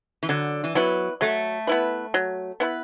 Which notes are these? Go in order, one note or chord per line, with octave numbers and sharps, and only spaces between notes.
E3
D3 F#3
E3
F#3 B3 E4 B4
F#3 A3
B3 E4 B4
F#3
B3 E4 B4